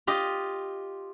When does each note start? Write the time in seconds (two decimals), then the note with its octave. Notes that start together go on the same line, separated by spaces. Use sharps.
0.07 F4 G4 D#5